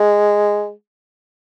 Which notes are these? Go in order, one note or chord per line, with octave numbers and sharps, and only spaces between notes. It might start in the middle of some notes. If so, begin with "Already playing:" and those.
Already playing: G#3